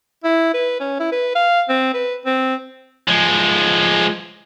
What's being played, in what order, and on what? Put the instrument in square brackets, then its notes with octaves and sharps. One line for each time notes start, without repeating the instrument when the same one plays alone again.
[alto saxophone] E4
B4
C#4
E4
B4
F5
C4
B4
C4
[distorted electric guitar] F3 G#3